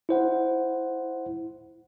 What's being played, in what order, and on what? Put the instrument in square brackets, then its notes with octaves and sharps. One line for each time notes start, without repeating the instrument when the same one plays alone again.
[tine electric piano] E4 C5 F#5